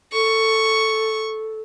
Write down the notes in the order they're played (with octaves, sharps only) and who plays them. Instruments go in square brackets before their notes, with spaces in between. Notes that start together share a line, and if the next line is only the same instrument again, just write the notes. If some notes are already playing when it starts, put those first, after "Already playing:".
[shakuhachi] A4 [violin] C#6